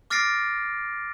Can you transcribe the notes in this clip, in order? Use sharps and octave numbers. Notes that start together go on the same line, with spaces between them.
D6 F6 A6 A#6 C7 D7